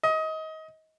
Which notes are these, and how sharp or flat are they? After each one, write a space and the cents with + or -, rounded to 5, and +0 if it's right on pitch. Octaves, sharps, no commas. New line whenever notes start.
D#5 +25